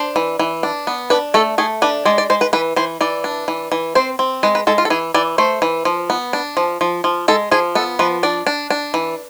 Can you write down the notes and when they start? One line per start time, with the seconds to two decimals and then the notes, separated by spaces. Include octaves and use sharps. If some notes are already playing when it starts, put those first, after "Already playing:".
Already playing: D4 C5
0.16 E3
0.39 E3
0.63 D4
0.87 B3
1.10 D4 B4
1.34 A3 A4
1.58 A3 G#4
1.82 D4 B4
2.05 G#3 D5
2.18 D5
2.30 G#3 C5
2.41 B4
2.53 E3 B4
2.76 E3 C5
3.01 E3 D5
3.24 D4
3.48 E3
3.72 E3
3.95 C4 C5
4.19 C4
4.43 G#3 B4
4.55 B4
4.67 G#3 A4
4.78 F4
4.85 A4
4.90 E3 G#4
5.14 E3 D5
5.38 A3 C5
5.62 E3
5.85 F3
6.10 B3
6.33 D4
6.57 F3
6.81 F3
7.04 F3
7.28 G#3 A4
7.51 F3 G#4
7.75 B3 A4
7.99 F3 B4
8.23 D4 D5
8.47 D4
8.70 D4
8.94 E3